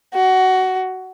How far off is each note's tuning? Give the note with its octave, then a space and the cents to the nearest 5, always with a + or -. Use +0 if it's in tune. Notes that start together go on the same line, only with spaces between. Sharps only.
F#4 +15